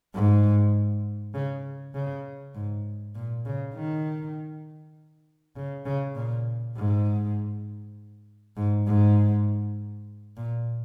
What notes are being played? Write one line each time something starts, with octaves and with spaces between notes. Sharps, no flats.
G#2
C#3
C#3
G#2
A#2
C#3
D#3
C#3
C#3
A#2
G#2
G#2
G#2
A#2